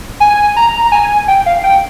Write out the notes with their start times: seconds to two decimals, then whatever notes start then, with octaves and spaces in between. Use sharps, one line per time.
0.20 G#5
0.56 A#5
0.82 A#5
0.92 G#5
1.28 G5
1.46 F5
1.64 G5